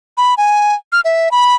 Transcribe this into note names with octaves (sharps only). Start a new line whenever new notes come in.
B5
G#5
F6
E5
B5